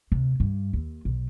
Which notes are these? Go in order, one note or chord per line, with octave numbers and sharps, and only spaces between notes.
D2 C3
G2
D#2
B1